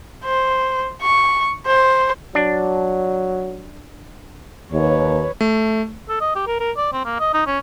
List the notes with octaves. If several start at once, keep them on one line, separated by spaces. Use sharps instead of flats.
C5
C#6
C5
F#3 D4
D#2 B4 C#5
A3
A4
D#5
G4
A#4
A#4
D5
C4
A#3
D#5
D#4
C#4